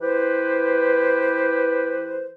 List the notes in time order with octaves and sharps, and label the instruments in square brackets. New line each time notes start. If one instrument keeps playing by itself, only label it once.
[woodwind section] E3 E4 G4 B4 C5